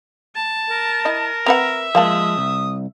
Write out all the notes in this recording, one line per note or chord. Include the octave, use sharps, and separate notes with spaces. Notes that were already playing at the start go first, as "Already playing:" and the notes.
A5
A#4
E4 D#5
C4 B4 E5 F#5 A#5
F3 G#3 A#3 F5 A5 D#6
C2